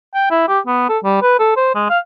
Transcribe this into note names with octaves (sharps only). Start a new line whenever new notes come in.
G5
E4
G4
B3
A4
G3
B4
A4
C5
G#3
F5